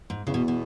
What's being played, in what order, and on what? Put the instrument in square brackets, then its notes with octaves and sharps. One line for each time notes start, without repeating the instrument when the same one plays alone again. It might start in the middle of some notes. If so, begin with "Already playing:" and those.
[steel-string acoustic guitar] G#2
[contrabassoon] E2 [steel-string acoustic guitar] C#3
[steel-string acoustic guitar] B2
B2